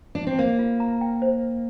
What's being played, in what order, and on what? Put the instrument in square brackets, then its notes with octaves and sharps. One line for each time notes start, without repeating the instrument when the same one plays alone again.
[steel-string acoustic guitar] D4
C4
[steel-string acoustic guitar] A#3 [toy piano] C5
[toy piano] F4
A#5
G5
C5